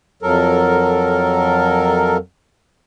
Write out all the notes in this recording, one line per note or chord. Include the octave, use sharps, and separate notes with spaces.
F2 F#3 A4 A#4